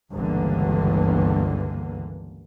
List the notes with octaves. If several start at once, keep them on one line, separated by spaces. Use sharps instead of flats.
G1 C#2 G2 D3 E3 A#3